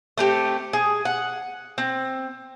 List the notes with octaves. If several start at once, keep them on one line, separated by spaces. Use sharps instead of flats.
A3 C4 G4
G#4
F#5
C4